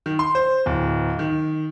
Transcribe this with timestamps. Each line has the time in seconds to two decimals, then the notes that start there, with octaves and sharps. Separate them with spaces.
0.06 D#3
0.19 C6
0.35 C5
0.66 D1
1.19 D#3